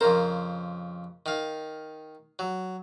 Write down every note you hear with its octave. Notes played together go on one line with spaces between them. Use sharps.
F2 C#3 A#4 C5
D#3 F5
F#3